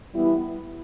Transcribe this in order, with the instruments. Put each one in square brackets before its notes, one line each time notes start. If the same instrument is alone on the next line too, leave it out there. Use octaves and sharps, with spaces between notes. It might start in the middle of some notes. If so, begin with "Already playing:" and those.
[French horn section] E3 G3 B3 E4